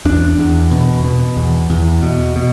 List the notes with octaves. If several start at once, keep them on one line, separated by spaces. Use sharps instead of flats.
E2 D4
E2
B2
B2
E2
E2
B2
B2